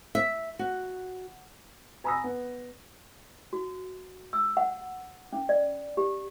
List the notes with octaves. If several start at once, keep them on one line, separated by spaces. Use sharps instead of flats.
E5
F#4
G#5 A#5 B5 D#6 E6 A#6
B3
F#4
E6
F#5
C#4
D5
G4